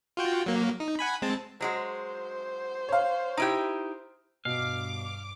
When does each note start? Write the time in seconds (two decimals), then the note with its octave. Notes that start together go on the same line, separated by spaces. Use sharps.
0.17 F4 F#4 G5
0.46 F#3 A#3
0.80 D#4
0.99 F#5 G#5 B5
1.22 G#3 C4 A5
1.61 F#3 G#3 F#4 C5
2.89 C#5 F5
3.37 D#4 E4 G4 D7
4.45 G2 B2 F5 D6